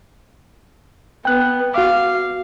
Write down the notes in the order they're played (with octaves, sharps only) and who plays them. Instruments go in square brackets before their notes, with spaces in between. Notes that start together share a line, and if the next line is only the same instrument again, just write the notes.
[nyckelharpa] B3 [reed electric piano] G5 F#6
[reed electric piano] F#4 D6 [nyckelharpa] F5